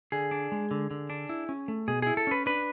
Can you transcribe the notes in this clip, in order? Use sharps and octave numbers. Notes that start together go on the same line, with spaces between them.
D3 G#4
D4
G#3
D3
D3
D4
E4
C#4
A3
B2 G#4
E4 G#4
A4
C#4 B4
D4 B4